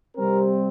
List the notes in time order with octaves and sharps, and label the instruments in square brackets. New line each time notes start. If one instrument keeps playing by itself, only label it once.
[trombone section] C3 G3 C4 A#4